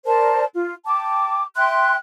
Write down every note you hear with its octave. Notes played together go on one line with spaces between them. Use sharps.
A#4 C5 D5 A5
F4
G5 A5 D6
E5 G5 C6 F#6